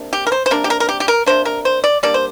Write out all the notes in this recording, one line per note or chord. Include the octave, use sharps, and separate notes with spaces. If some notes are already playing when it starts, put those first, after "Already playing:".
Already playing: C3 A#3 D4
G4
A#4
C5
C5
C3 A#3 D4 A#4
G4
A#4
A#4
G4
G4
A#4
C3 A#3 D4 C5
A#4
C5
D5
G3 A#3 D4 D5
C5